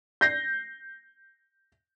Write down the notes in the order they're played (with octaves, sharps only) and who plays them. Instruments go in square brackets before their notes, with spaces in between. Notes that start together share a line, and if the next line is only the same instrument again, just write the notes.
[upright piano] G6 A#6 C7